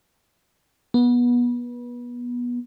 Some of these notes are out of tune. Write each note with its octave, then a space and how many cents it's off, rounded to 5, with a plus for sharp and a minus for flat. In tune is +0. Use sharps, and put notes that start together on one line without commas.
B3 -25